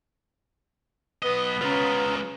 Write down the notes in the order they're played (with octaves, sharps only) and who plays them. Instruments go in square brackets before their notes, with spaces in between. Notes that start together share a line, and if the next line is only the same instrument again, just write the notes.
[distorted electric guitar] B1 D#5 [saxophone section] B3
[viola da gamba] C#3 C#4 [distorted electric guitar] G#3 F4 [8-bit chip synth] B4 A#5